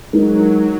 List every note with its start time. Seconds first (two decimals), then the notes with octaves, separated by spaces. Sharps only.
0.13 F#3 G#3 D#4 A#4